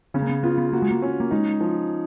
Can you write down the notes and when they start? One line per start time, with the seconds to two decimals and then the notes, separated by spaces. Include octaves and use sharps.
0.14 C#3 C#4
0.22 A#3
0.29 B3
0.43 B3 F4
0.58 B3
0.72 A#3 F#4
0.82 G#3
0.91 A#3
1.02 C#4
1.20 A#3
1.31 G#3 D#4
1.60 F3